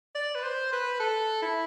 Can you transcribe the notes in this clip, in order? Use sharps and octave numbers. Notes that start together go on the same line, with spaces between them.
D5
B4
C5
B4
A4
E4